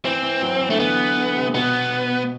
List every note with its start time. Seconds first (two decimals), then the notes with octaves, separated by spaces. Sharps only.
0.05 E3 C4
0.23 E3
0.42 F#3
0.61 E3
0.70 D3 A3
0.79 E3 B3
1.18 D3
1.36 C3
1.54 B2 B3